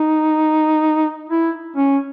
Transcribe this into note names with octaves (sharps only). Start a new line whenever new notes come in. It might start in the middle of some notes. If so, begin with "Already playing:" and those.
Already playing: D#4
E4
C#4